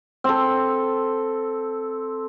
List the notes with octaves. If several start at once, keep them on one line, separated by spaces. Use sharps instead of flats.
C4 A4